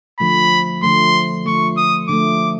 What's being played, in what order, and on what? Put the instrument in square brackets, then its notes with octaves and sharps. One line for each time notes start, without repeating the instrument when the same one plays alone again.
[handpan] D3 F3 A3 [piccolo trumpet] B5
[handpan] D3 F3 A3 [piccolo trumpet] C6
[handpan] D3 F3 A3 [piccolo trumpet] C#6
[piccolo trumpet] D#6
[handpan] D3 F3 A3 [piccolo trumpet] D6